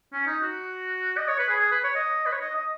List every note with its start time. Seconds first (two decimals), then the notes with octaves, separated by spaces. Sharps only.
0.13 C#4
0.27 D#4
0.43 F#4
1.18 D#5
1.28 C#5
1.39 B4
1.49 G#4
1.60 G#4
1.71 B4
1.84 C#5
1.95 D#5
2.26 B4
2.32 C#5
2.41 D#5
2.56 D#5